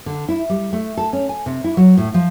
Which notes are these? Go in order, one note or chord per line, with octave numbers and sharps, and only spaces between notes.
D3
E4
G3
A3
A4
C#4
G#5
C3
E4
F#3
A2
F3